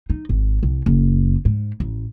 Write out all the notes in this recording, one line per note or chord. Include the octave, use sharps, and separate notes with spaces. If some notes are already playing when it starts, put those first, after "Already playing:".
D#4
G#1
C2
F#1
G#2
A1